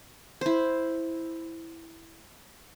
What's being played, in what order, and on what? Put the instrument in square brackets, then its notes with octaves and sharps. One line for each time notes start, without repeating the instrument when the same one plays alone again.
[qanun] E4 C5